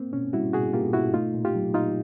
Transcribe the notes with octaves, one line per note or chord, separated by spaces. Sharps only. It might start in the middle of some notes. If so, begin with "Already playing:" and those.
Already playing: A#3 C4
B2 C#4
G3 E4 F#4
B2 F#4 G#4
A#3 F4 G4
B2 E4 F#4
A3 D#4 F4
A#2
F4 G4
F#3
A#2 D#4 F4